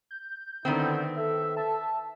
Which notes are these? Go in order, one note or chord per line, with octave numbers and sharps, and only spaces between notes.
G6
D3 D#3 B3 C4 E4
A4 E5
E5 A5